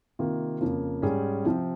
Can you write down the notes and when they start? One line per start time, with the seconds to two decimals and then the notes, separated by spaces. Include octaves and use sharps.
0.19 C3 D#3 A#3 F4
0.61 F2 C#3 F3 A#3
1.02 G#2 G3 C#4 G#4
1.45 C3 F3 C4